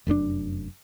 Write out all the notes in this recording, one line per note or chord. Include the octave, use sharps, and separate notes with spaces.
F1 F#2 B2 D4